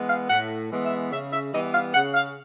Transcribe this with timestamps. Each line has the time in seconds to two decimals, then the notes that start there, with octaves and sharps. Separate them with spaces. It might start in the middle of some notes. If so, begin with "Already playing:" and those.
Already playing: E3 G#3 B3
0.09 F5
0.30 A2 F#5
0.70 E3 G#3 B3
0.83 E5
1.11 C#3 E5
1.32 E5
1.52 E3 G3 B3 D#5
1.72 F5
1.93 C#3 F#5
2.14 F5